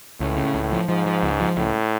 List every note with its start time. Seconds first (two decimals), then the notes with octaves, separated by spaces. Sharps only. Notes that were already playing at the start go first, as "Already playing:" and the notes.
0.20 C#2 A2
0.37 C#3
0.55 C#2
0.72 F3
0.89 G#2 F3
1.06 F3
1.23 C#2
1.40 F3
1.57 C#2 A2